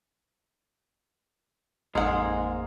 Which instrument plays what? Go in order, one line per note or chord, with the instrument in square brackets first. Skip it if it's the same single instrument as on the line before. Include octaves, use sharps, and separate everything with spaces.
[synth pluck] A1 F2 [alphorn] G#2 [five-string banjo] G#3 F#5 [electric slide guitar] A#3 F4 G#4